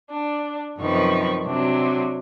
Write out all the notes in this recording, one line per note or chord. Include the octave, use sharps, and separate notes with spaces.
D4
F#2 C3 D#3 F3 B4 C#6
C3 F#3 D4